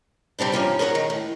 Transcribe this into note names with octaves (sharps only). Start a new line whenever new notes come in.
C3 G3 C4 D4 E4
G2 D#3 F3 C#4
G#4 A#4 C#5 D5 F#5
D#3
A2